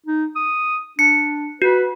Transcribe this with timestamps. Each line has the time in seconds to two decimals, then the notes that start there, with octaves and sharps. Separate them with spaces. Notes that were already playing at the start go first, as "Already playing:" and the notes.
0.06 D#4
0.36 D#6
0.99 D4 C#7
1.62 F#4 B4